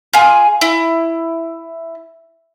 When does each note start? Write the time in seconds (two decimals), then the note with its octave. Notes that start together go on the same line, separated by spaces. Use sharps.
0.13 F4 G#4
0.61 E4